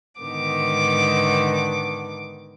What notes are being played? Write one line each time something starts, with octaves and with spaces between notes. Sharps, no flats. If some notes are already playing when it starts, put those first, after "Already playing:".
G#2 D3 D#3 B3 D6